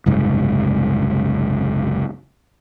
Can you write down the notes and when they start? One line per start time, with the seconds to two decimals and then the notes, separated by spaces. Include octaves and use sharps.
0.06 F#1 C2 G#2